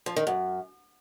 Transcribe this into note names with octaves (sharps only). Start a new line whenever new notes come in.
F3
D#3
F#2